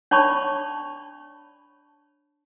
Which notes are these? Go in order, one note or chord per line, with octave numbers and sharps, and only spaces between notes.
D4 C#5 D5 A5 B5 C#6